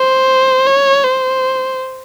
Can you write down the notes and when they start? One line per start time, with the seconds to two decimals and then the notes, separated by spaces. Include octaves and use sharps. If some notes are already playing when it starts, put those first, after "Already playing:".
Already playing: C5
0.67 C#5
1.05 C5